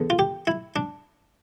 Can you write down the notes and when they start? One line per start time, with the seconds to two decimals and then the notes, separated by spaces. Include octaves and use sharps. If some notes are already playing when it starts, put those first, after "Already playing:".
Already playing: E2 D3
0.10 F4
0.19 G4
0.47 E4
0.76 D4